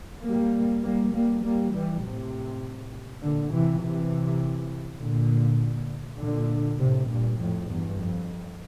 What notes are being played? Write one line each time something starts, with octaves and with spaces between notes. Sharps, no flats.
G3 A#3
G3 A#3
G3 A#3
G3 A#3
E3 G3
A2 C3
A#2 D3
C3 E3
C3 E3
A#2 D3
A#2 D3
A2 C3
G2 A#2
F2 A2
E2 G2
F2